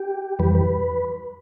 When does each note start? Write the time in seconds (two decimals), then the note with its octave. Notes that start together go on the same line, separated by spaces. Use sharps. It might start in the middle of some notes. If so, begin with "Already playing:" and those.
Already playing: G4
0.39 F2 E3 G3 B4
0.55 B4